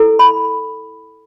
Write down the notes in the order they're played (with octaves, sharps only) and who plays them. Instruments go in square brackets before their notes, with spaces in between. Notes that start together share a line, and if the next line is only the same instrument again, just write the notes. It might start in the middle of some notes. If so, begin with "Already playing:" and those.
Already playing: [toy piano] E4 A4
B5